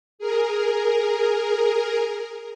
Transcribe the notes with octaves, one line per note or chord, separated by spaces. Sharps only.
G#4 A#4